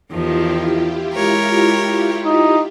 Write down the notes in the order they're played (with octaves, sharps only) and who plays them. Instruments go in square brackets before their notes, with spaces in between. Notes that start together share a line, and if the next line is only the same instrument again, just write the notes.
[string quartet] E2 D#3 F3 [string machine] E4 F4 G4
[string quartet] G#3 A#4 C#5
[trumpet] D#4